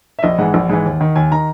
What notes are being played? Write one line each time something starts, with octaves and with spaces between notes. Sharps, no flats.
E5
A#1 D#5
G#2 E3 F#5
A#1
G#2 E3
D#2
D#3
D#2 G#5
D#3 A#5